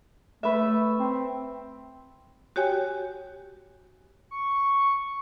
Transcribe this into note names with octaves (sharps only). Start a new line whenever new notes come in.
A3 B4 E5
C4
F#4 G4 C#5 G5 G#5
C#6